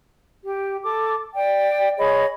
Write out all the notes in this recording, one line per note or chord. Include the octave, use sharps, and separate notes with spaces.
G4
A4 D6
D5 G5
G#4 C#5 D#5 B5